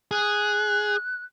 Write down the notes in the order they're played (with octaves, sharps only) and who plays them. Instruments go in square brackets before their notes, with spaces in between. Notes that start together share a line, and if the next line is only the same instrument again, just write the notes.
[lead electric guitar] G#4 [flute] F#6